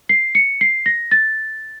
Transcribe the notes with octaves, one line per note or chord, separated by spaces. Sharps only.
C7
C#7
C7
A#6
A6